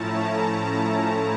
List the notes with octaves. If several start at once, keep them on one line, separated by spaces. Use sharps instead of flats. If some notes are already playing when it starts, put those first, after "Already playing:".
Already playing: A2 F3 A3 C#4 E4 A5 A#5